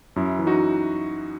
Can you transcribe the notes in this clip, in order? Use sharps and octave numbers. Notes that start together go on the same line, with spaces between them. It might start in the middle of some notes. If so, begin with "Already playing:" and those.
F#2 E4
E3 E4
D#4 F#4